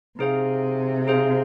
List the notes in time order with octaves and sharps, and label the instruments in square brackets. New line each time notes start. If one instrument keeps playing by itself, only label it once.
[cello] C3 [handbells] D#4 G#4 C5 F5
[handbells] D#4 G#4 C5 F5